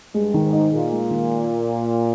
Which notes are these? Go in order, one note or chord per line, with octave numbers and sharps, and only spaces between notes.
G2 G#3
D#3
G#2
D#4
A#2 G#4
G#3
D#3